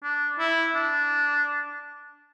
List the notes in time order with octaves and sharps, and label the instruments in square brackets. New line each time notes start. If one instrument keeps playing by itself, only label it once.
[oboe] D4
E4
D4